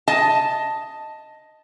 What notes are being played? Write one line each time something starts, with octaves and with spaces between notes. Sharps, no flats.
D#5 A5